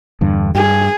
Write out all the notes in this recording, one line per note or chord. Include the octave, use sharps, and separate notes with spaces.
E2 G2 D3
G2 G#4